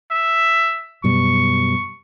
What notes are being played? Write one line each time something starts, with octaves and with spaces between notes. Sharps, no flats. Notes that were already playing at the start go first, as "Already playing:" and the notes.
E5
F#2 B2 G3 C#6